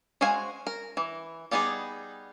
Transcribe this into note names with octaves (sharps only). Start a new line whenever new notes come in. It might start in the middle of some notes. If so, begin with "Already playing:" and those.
G#3 F#4 C5 F5 G#5
A#4
E3
G3 B3 D#4 E4 G#4